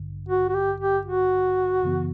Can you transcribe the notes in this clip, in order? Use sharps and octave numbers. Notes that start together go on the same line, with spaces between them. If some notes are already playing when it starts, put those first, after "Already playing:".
Already playing: A1 G2 D3
F#4
F#4
G4
G4
F#4
F#2 C#3 E3 B3